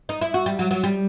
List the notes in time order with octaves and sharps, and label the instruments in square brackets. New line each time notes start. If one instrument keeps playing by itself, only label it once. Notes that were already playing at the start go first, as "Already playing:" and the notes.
[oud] D#4
E4
F#4
G3
F#3
F#3
G3